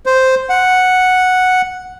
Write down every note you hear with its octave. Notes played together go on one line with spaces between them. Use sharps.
C5
F#5